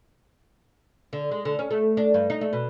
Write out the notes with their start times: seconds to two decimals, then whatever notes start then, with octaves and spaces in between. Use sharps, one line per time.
1.13 D3
1.31 G#3
1.45 D3
1.59 C#4
1.71 A3
1.97 D4
2.14 G2
2.30 D#4
2.41 A3
2.53 B2